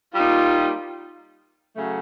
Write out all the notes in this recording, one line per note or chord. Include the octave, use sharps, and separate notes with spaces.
G3 A#3 D#4 F4
C#3 F#3 A3